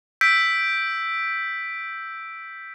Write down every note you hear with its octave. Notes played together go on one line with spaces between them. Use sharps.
E6 G6 B6 D7